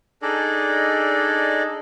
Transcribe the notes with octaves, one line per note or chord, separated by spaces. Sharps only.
D4 D#4 G#4 A4 D5 D#5